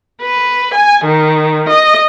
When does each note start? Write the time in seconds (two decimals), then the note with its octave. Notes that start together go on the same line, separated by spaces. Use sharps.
0.22 B4
0.74 G#5
1.04 D#3
1.69 D#5